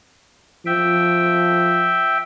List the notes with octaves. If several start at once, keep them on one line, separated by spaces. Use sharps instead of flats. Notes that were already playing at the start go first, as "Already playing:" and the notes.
F3 E5 G5